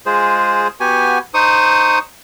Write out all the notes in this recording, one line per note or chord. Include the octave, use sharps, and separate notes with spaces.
G#3 F4 G#4 C5
B3 F#4 G4 G#5
D#4 C5 C#6 D#6